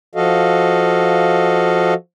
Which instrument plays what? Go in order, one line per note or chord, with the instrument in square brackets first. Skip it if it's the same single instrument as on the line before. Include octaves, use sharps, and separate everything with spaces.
[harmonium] F3 F#4 A4 D#5 F5